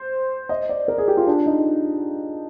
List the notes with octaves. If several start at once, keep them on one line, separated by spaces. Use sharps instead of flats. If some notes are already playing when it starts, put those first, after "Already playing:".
Already playing: C5
D#5
D5
A#4
G#4
G4
F4
D4
D#4